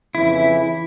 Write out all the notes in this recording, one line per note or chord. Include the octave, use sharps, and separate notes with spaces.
F2 C#3 E3 E4